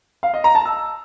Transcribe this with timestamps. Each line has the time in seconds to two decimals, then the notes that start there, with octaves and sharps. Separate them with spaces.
0.23 F5
0.34 D#5
0.44 A#5
0.55 A5
0.66 E6